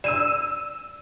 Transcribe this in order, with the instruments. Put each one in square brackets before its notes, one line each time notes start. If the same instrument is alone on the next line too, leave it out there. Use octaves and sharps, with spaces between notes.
[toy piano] D5 [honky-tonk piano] E6 D#7 E7